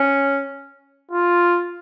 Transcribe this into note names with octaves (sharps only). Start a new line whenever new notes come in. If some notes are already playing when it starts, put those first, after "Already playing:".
Already playing: C#4
F4